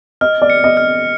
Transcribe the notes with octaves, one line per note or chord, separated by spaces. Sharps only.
D#5 F6
D5
C#7
D#5
F6